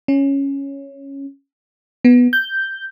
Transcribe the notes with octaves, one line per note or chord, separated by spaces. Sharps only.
C#4
B3
G6